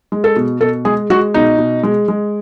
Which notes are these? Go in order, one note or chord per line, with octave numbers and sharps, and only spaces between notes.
G#3
A4
B2
B2 A4
G#3 G#4
G#3 F#4
B2 D#4
B2
G#3
G#3